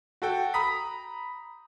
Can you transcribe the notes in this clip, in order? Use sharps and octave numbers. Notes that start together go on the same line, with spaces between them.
F#4 A4 G5
A#5 B5 D#6 B6